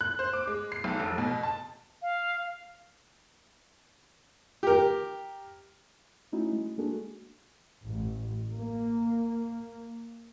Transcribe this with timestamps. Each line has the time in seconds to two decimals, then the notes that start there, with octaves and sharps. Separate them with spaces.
0.01 F#6
0.19 C5
0.33 D6
0.47 G#3
0.72 C7
0.84 B1
1.00 F1
1.18 B2
1.43 A5
2.02 F5
4.63 G4 A#4
6.32 A3 C#4 D#4 E4 F#4
6.53 G#3
6.78 G#3 A#3 D4 F#4 G#4 A4
7.83 A1
8.56 A#3